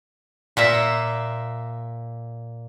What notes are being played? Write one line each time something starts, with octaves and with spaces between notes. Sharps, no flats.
A#2 A#3 E5